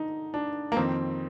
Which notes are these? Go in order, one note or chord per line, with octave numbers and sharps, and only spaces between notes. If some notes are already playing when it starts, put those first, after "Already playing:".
Already playing: D3 D#4
D4
A#3
F2 D#3 C4